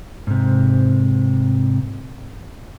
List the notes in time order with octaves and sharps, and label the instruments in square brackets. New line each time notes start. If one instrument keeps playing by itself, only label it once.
[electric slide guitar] G#2 C3